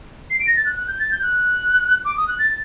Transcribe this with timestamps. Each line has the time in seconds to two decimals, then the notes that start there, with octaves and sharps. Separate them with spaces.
0.30 C7
0.39 D7
0.47 A#6
0.57 A6
0.65 F#6
0.76 F#6
0.88 G6
0.99 A6
1.11 G6
1.22 F#6
2.05 D6
2.17 D#6
2.28 F#6
2.39 A6